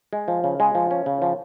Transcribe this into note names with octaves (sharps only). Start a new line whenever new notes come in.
G#3
F3
C#3
G#3
F3
C#4
C#3
F3